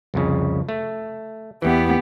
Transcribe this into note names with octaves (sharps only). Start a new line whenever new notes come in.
C2 F2 C#3
A3
E2 E3 B3 G4